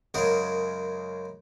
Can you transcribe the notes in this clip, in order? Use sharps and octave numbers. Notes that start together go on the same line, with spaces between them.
F#2 C#3 G#3 A#4 F#5 D#6